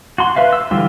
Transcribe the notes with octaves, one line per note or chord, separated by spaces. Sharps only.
F#4 C6
B4 E5 F5
E6
D3 E3 G3 F4